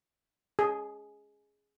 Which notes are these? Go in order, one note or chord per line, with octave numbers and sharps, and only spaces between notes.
G#4